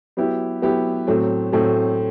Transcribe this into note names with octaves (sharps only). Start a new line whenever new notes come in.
F#3 B3 E4 G4
F#3 B3 E4 G4
A2 F#3 A3 C4
A2 F#3 A3 C4